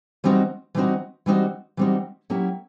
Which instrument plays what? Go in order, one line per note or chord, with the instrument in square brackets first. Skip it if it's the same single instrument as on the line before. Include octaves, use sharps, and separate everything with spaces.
[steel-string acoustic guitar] E3 G3 C4 D#4 F#4
E3 G3 C4 D#4 F#4
E3 G3 C4 D#4 F#4
E3 G3 C4 D#4 F#4
F#3 A#3 C#4 E4 G4